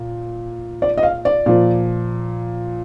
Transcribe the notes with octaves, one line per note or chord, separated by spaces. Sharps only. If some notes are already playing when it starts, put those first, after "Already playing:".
Already playing: A#2
D5
D#5
F5
D5
A#2 F3